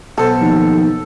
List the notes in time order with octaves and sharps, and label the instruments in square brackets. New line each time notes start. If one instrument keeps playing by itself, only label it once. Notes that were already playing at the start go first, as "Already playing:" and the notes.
[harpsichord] B1 B2 C5 [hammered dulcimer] A4
[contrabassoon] D#2 [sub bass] F3